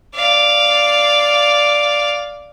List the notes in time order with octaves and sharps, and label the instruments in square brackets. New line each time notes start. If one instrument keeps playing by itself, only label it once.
[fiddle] D5 F5